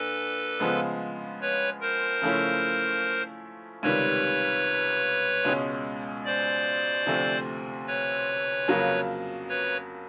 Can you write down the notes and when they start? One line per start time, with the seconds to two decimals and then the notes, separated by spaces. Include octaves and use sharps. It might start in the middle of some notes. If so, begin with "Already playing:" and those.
Already playing: A#2 D4 A4 B4
0.60 C#3 F3 G#3 B3
1.41 B4 C#5
1.81 A#4 C5
2.22 C#3 F3 A3 C#4 E4
3.83 C#2 C3 D#3 G3 B4 C#5
5.45 C#2 B2 G#3 C#4
6.25 C5 D5
7.06 D2 C3 F3 A3 C4
7.87 B4 C#5
8.68 F2 C#3 F#3 A#3
9.49 B4 C#5